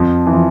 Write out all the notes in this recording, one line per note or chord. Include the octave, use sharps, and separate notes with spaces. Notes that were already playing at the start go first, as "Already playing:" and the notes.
Already playing: F2 F3
E3
F3